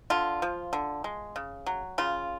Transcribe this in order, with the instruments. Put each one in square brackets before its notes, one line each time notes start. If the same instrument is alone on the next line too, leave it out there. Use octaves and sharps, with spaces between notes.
[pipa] D3 F4
F3
D3
G#3
C#3
F#3
C#3 F4